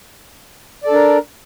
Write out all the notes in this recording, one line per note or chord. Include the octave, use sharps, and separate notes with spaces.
D4 A4 A#4 D5